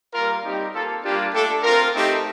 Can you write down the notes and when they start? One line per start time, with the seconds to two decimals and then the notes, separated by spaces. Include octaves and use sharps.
0.13 G3 A#3 F4 A#4
0.43 G3 C4 D#4 G4
0.73 A#3 F4 A4
1.03 G3 A#3 D4 F4 G4
1.33 A3 D4 G4 A4
1.63 C4 F4 A#4
1.93 A3 C4 D#4 G4